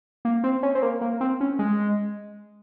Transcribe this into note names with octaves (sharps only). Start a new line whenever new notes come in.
A#3
C4
C#4
C4
A#3
A#3
C4
C#4
G#3